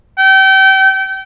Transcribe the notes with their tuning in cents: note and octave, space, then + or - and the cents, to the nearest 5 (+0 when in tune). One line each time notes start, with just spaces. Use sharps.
G5 -30